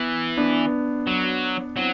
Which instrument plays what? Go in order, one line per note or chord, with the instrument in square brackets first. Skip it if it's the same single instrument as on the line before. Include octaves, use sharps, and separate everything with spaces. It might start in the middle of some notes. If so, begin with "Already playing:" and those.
Already playing: [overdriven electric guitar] E3 [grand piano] B3
[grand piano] B3 D4
[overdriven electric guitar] F#3
[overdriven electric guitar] F#3 [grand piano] C4 E4